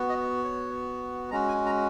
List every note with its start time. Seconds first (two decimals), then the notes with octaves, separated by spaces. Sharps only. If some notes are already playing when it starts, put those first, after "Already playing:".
Already playing: B3 F#4
0.09 D#5
0.44 C#5
1.31 G#3 C#4 F#4 A#5
1.48 G#5
1.66 A#5